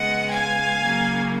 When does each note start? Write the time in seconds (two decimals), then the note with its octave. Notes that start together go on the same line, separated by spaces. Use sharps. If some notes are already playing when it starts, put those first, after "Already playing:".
Already playing: C#3 G#3 B3 D#5 F#5
0.30 F5 G#5
0.81 C#3 F#3 A#3